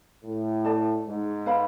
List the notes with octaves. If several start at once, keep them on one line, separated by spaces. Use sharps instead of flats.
A2
A4 D5 A5
G#2
B4 F5 B5